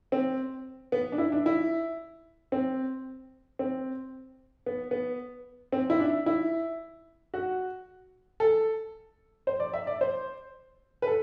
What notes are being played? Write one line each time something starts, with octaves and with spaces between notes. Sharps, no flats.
C4
B3
D4
E4
D4
E4
C4
C4
B3
B3
C4
E4
D4
E4
F#4
A4
C5
D5
E5
D5
C5
B4
A4